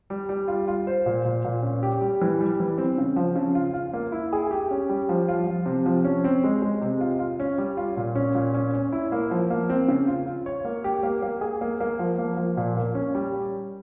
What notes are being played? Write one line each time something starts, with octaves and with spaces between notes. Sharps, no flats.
G3
G3
F4
F4
C5
A#2
A#2
A#2
C#4
G4
G3
E3
G3
E3
C4
C#3
F3
C#3
F4
F4
A#3
E4
G#4
G4
C#4
G3
F3
F4
F3
C3
F3
C#4
C4
G#3
G#3
C3
F4
F4
C#4
G3
F4
A#2
C#4
A#2
C#4
C#4
E4
A#3
F3
A#3
C4
C#3
F4
F4
C#5
A#3
G4
A#3
A#3
G#4
A#3
A#3
F3
A#3
F3
A#2
A#3
C#4
G3